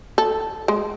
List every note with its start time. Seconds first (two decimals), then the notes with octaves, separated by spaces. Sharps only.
0.18 A4
0.68 G#3